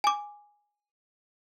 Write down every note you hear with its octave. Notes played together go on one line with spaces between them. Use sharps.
G#5 D6